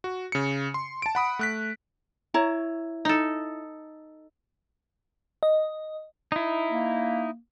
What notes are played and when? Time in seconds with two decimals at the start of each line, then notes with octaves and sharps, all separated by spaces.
0.04 F#4
0.32 C#3 C#7
0.74 C6
1.02 A5 D7
1.15 F#5 B5 D#6
1.39 A3 F#6 B6
2.34 E4 C#5 A#5
3.05 D#4 A4
5.43 D#5
6.32 D#4 E4
6.71 A#3